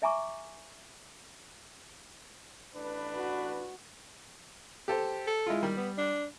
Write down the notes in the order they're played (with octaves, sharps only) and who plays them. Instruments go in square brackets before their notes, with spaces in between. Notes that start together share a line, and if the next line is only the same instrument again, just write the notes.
[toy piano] D5 E5 G#5 A#5 C#6 D6
[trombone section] A1 D4 B4
[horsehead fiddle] F#4
[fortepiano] G4 A4 C5
[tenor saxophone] A4
[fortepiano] G#3 E4 F4
[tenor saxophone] D#3 [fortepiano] G3
[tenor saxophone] B3
D4